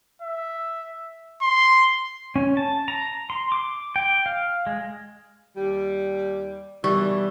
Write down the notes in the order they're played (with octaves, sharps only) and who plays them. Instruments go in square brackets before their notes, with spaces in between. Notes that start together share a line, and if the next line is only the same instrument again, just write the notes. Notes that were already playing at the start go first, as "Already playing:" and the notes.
[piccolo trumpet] E5
C6
[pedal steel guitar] C#4
A5
A#5
C6
D6
G5
F5
G#3
[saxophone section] D#2 G3
[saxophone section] B2 D#3 E3 [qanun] G3 [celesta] C#6